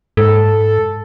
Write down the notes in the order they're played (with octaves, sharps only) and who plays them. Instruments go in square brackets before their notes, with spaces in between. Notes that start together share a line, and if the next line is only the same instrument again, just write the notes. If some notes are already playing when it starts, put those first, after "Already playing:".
[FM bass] G#2 [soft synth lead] A4